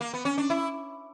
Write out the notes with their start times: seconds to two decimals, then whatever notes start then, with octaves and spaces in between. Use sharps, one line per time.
0.01 A#3
0.14 B3
0.25 C#4
0.38 D4
0.50 E4